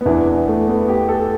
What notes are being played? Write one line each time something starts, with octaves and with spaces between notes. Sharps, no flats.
B3
E2 E3 D4
A3
B3
G4
A4